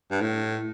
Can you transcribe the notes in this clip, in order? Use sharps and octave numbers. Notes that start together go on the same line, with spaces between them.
G2
A2